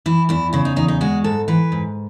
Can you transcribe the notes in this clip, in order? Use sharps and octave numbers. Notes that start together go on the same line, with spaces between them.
E3 E4
E2 E4
C#3 E4
D#4
E2 D#4
D#4
G#3 F#4
G#2 A4
E3 B4
G#2